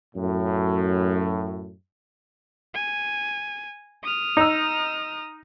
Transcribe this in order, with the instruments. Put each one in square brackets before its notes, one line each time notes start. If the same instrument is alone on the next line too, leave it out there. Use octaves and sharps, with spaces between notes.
[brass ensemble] F#2 A2
[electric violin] G#5
D#6 F6
[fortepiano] D#4 E6